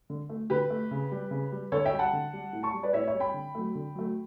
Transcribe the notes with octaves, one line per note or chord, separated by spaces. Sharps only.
D3
A3
D3 G4 B4
A3
C#3
G3
C#3
G3
D3 A4 C#5
E5 G5
G3
F#5 A5
D3
G3
A2
A5 C#6
G3
B4 D5
A2 C#5 E5
C#5 E5
G3
G5 B5
D3
F#3 A3
D3
F#3 A3